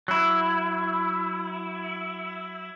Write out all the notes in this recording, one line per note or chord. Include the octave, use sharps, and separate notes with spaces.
F#3 E4